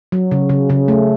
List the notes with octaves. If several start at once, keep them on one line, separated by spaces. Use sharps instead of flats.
F#3
C#3
C#3
C#3
A3